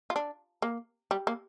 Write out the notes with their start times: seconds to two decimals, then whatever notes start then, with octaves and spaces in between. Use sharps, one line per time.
0.10 F4
0.16 D4
0.62 A#3
1.11 G3
1.27 A#3